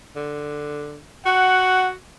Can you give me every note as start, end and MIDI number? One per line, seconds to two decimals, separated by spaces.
0.16 1.04 50
1.26 1.95 66
1.26 1.88 78